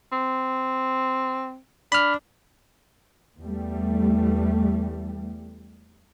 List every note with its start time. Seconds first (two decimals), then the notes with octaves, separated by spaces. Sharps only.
0.12 C4
1.92 D4 B5 F6
3.40 E2 G3 A3